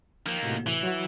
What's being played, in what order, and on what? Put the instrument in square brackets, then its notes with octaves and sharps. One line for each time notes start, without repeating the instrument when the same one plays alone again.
[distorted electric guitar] D#3 A#3 [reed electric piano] F3
[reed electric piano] A2 C3 F#4
[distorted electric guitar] E3
[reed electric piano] F#3 F#4